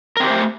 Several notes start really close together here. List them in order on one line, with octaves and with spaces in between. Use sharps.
A#4 C4 G4 C5 A3